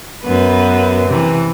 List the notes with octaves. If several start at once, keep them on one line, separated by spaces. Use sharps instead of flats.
F#2 B3 B4
C3 E3